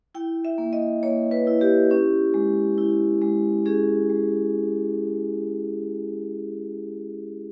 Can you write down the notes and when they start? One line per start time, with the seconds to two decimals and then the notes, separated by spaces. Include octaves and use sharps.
0.15 E4 G5
0.45 E5
0.58 A#3
0.73 D#5
1.03 A#3 C#5
1.31 B4
1.47 E4
1.61 G4
1.91 C#4
2.34 G#3
2.78 E4
3.22 G#3
3.66 C#4 G#4
4.10 G#3